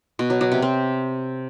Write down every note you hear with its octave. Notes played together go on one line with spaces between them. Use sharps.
B2
F#3
F#3
C3
C4